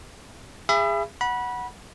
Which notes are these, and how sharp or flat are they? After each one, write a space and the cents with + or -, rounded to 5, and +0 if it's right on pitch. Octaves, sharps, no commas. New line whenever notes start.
G#4 -25 E5 +35 B5 +0
F#5 +0 B5 -25